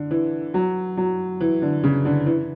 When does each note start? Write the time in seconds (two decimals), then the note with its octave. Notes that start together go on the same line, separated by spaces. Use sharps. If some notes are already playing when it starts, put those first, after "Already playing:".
Already playing: D3
0.11 E3
0.54 F#3
0.97 F#3
1.40 E3
1.62 D3
1.83 C#3
2.05 D3
2.26 E3